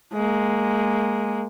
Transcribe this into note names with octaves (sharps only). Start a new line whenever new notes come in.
G#3 A#3